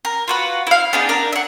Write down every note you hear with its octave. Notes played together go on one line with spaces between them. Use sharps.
A#4
F4 F#4 B4
E4 F5
B3 D4 D#4 G#4
D4 A#4
E5 F#5